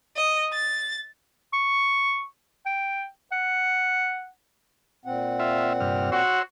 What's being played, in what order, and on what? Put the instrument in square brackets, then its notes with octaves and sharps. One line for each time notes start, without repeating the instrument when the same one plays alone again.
[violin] D#5
A6
[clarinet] C#6
G5
F#5
[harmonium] A#2 C4 F#5
[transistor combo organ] F4 E5
G2 C3 F6
[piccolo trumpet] F#4 [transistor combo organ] C#5 C6 E6